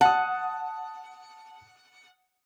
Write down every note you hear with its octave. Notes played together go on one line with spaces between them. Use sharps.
F#5 A5 D#6